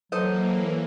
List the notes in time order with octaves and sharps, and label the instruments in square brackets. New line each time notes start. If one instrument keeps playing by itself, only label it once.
[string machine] E3 A#3 [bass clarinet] F#3 [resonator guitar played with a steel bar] A4 C5 D#5